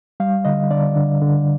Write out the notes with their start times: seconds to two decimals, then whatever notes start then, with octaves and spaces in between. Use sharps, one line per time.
0.20 G3 F5
0.45 D3 D#5
0.71 D3 D5
0.96 D3
1.21 D3